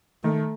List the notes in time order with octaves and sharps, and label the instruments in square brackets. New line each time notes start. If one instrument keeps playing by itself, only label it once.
[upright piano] D#3 [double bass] A3